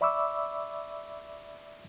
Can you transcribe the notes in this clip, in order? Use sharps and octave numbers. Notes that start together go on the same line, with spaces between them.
D5 E5 B5 C#6 D6 E6